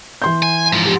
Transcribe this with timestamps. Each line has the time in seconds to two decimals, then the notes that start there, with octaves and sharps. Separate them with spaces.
0.22 E3 C6 G6
0.43 G#5
0.73 G#2 F3
0.85 G4